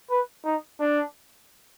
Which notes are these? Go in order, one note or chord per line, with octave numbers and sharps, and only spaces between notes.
B4
D#4
D4